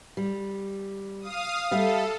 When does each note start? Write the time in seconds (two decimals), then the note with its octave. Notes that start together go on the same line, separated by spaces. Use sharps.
0.17 G3
1.20 F5 D#6
1.71 G3 A4 E5 F5